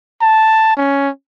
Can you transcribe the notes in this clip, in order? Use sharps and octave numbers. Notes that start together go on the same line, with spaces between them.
A5
C#4